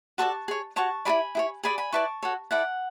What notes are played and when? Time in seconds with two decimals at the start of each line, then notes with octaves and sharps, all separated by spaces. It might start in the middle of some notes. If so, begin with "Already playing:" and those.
0.18 F#4 A4 D5 A5 C#6
0.48 G#4 C#5
0.76 F#4 C#5 A5 C#6
1.05 E4 A4 D5 G#5 B5
1.35 E4 G#4 C#5
1.63 G#4 D5 G#5 B5
1.78 G#5 B5
1.92 E4 B4 D5 A5 C#6
2.23 F#4 A4 C#5
2.51 E4 A4 D5 F#5